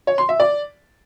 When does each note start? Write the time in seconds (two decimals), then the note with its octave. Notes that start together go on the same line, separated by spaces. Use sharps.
0.07 C#5
0.18 C6
0.29 E5
0.40 D5